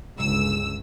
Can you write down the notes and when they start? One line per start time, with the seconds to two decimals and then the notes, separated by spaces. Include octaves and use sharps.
0.17 G1 C#2 E6